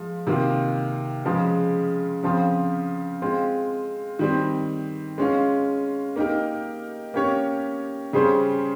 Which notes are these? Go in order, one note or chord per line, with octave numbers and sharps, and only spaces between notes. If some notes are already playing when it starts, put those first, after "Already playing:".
Already playing: F3 G#3
C3 D#3 A#3 F4
C#3 F3 G#3
C#3 F3 C4 F4
G#3 C4 F4
D#3 G3 C4
G#3 C#4 F4
A#3 D#4 G4 A#4
A#3 C#4 G4 C#5
C#3 G3 C#4 G#4 C5